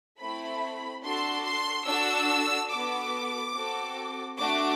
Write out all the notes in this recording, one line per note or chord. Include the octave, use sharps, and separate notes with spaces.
A3 C4 E4 B5
D4 F#4 A4 C6
C6
D4 F#4 A4 E6
B3 F#4 A4 D6
C4 F#4 A4
A3 D4 F#4 D6